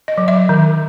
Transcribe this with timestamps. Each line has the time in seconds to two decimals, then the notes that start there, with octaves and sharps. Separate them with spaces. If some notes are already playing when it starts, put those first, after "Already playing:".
0.08 D#5
0.18 F#3
0.28 E5
0.49 D#3